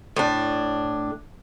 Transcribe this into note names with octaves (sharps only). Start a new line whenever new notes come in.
A2 D4